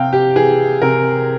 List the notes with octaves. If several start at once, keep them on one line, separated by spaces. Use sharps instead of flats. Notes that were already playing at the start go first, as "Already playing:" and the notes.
Already playing: C3 F5 G5
G4
E3 G#4
C3 A#4